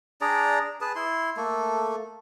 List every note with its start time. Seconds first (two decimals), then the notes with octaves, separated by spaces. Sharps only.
0.21 D4 G#4 D5 A#5
0.81 G#4 B4 A5
0.95 E4 C6
1.37 A3 A#3 A4